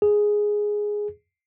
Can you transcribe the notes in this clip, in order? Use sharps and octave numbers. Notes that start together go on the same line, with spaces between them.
G#4